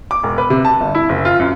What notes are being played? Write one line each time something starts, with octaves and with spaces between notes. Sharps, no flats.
D6
E1
B4
C3
A5
G1
E4
F#1
F4
F#2